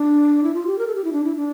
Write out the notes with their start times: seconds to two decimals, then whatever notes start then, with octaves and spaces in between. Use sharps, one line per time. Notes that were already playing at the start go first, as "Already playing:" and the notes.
Already playing: D4
0.44 E4
0.54 F4
0.67 G4
0.79 A#4
0.87 A4
0.95 G4
1.04 E4
1.13 D4
1.24 E4
1.36 D4